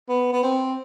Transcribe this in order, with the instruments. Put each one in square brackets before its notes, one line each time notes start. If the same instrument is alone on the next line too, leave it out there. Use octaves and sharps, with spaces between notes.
[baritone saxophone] B3
B3
C4